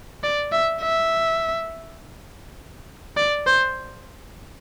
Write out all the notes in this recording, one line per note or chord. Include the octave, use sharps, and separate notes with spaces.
D5
E5
E5
D5
C5